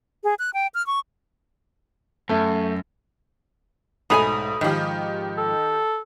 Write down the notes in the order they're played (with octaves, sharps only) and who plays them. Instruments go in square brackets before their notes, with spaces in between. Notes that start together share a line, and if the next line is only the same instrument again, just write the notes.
[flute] G#4
F#6
G5
F6
C#6
[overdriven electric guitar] F#2 [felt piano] A3
[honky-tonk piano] B1 A3 F7 [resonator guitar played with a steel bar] G#2 G#4 G#5 [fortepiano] B5 D#6
[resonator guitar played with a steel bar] G#2 F3 [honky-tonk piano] D#3 G4
[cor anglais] A4